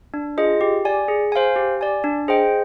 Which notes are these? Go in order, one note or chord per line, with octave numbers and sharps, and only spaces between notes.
D4
F4 G#4 D#5
G4
D5 G#5
G#4
C5 F5 G#5
G4
D5 G#5
D4
G#4 C5 D#5 G5